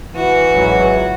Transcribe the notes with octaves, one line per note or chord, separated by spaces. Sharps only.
E3 F#4
G#1 C#2 F#3